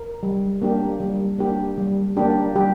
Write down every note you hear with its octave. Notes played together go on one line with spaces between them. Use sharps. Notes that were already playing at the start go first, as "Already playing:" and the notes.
Already playing: A#4
G3
A#3 D4 G4
G3
A#3 D4 G4
G3
A#3 D4 G4
G3 G4